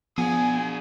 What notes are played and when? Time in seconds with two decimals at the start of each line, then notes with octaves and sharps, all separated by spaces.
0.18 F3 B3 D4 G#4 G#5